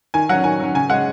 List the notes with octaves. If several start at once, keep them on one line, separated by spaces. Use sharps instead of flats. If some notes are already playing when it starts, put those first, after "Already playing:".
D#3 G#5
F#3 C#4 F#5
D#3 G#5
F#3 C#4
C#3 G#5
G#3 C#4 F#5